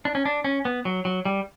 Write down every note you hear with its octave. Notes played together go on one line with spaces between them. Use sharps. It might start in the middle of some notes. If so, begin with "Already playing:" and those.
D4
C#4
D4
C#4
B3
F#3
F#3
G3